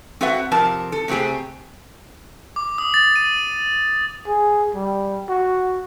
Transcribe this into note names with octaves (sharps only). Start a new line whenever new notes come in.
C4 F#4 A4 B4 E5 F#5
F2 C3 A#4 A5
A4
C3 A3 C4 G4 G#4
D6
D#6
A6
D#7
G#4
G3
F#4